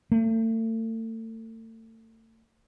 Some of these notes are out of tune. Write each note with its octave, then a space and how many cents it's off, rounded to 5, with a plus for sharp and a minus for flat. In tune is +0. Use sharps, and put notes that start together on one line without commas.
A3 +35